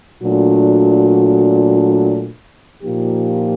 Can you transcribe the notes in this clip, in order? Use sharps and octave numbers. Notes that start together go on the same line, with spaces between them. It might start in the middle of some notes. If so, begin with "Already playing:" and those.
A#2 F#3 A3 D4 F#4
A#2 F3 A#3 D#4 G4